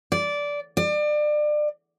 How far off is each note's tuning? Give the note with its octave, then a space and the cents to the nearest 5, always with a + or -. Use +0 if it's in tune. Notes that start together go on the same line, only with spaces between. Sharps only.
D5 -15
D5 +30